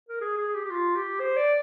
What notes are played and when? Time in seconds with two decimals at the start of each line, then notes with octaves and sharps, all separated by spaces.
0.09 A#4
0.21 G#4
0.37 G#4
0.54 G4
0.65 G4
0.70 F4
0.95 G4
1.20 C5
1.37 D5